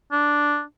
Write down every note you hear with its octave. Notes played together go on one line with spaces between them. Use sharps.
D4